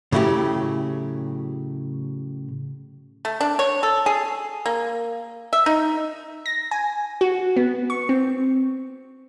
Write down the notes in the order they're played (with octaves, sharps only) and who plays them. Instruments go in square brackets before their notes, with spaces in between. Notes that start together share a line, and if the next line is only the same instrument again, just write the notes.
[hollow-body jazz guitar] A2 C#3 F#3 A3 E4 G4
[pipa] A3
D4
C#5
A4
G#4
A#3
E5
D#4
[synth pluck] A#6
G#5
F#4
B3
C#6
C4